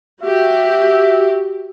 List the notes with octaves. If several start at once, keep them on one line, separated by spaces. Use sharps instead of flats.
F#4 G4 E5